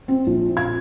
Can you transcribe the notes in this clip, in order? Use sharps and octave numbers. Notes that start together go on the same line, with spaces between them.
C4
A#1
G#6